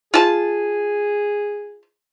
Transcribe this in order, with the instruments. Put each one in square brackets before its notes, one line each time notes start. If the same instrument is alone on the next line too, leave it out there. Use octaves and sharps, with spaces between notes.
[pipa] F4 A5 [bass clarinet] G#4